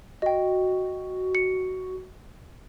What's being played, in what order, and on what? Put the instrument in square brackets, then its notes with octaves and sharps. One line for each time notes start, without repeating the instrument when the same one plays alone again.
[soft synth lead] F#4 [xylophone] D#5 G5
[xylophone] C#7